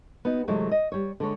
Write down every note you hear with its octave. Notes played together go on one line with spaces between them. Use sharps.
B3 D#4 F#4
C3 E3 F#3 G#3 A3
D#5
G3 C#5
D3 G#3 C#5